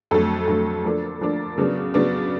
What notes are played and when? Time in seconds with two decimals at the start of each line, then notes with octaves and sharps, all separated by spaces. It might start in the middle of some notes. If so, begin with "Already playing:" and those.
0.11 F2 D3 F#3 A3 A4
0.47 F2 D3 F#3 A3
0.84 D3 F3 A#3 D4 A4
1.21 D3 F3 A#3 D4 A#4
1.58 C#3 F#3 B3 D4
1.94 C#3 F#3 B3 D4